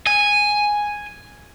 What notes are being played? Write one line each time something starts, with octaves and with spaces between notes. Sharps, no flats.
G#5